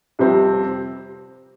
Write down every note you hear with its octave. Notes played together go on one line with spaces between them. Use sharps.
F2 C3 G3 C4